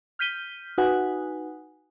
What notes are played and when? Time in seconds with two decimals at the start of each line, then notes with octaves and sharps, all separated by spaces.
0.19 F6 G6 B6 D#7 G7
0.78 D#4 F#4 B4 F#5 G#5